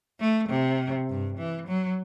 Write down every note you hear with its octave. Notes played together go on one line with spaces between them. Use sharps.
A3
C3
G2
E3
F#3